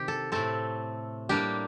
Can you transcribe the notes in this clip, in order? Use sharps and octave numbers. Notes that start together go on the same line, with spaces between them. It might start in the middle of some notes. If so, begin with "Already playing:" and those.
Already playing: C3 D#3 G4
A4
A2 A3 C4 A4
A2 G3 A#3 D4 G4